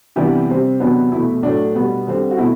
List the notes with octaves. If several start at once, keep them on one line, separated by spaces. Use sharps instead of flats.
C3 E3 G3 B3 D4 E4 G4
C3 G3 C4
E2 C3 F#3 B3 D4
E2 B2 A3 E4
A2 F#3 A3 D4
B2 G3 B3
D3 G3 C4
F#4
B2 A3 E4